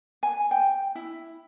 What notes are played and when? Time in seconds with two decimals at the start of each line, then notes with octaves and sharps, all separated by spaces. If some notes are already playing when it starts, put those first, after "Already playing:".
0.23 G#5
0.51 G5
0.95 E4